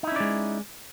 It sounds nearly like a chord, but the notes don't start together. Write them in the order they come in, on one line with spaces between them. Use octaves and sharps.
D#4 E4 C#4 D5 G#3